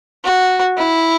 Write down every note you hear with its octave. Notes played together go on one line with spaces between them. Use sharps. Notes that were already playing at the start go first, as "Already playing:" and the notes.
F#4
E4